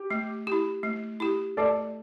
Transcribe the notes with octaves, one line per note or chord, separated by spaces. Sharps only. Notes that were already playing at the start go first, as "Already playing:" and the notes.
Already playing: G4
A3
E4 G4
A3
E4 G4
A3 A4 D5